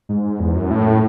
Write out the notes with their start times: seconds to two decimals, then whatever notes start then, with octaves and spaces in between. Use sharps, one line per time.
0.09 G#2
0.40 E2
0.55 F#2
0.71 A2